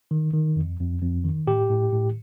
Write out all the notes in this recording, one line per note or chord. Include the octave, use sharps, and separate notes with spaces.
D#3
D#3
F2
F2
F2
D#3
A2 G4
A2
A2